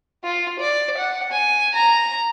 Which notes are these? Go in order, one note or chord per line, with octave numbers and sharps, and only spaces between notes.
F4
D5
F#5
G#5
A#5